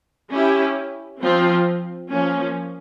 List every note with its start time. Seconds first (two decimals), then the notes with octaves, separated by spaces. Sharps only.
0.30 C#4 E4 G4
1.20 F3 C4 F4
2.10 F3 A#3 C#4